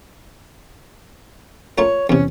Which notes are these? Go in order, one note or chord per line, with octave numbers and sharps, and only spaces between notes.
A3 F4 A#4 C#5
E2 C3 C#4